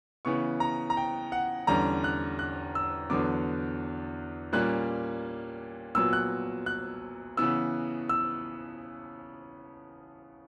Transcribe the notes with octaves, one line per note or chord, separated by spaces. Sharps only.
C#3 E3 B3 C#6
A#5
A#5
G5
F#5
E2 D3 G3 C#4 A#5
F#6
F#6
E6
E2 D3 F#3 B3 D6
A#2 G3 A#3 C#4 F#6
A#2 F#3 B3 E6
F#6
F#6
C#3 E3 B3 E6
E6